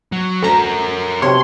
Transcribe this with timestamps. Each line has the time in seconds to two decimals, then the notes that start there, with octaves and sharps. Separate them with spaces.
0.12 F#3
0.42 D2 C#4 A4 A#4 A#5
1.22 B1 C3 C#5 G5 A5 C6 C#7